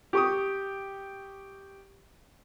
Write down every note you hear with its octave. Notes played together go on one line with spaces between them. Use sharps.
G4 C#6 D#6